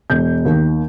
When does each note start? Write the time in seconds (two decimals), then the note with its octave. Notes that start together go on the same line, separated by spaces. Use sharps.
0.10 E1 G6
0.45 D#2 D#3